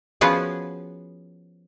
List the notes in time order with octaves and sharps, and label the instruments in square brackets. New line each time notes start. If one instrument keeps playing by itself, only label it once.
[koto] F3 B3 C#4 F#4 G#4